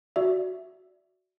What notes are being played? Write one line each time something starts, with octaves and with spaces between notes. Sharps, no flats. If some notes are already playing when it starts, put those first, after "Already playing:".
F#4 D5 E5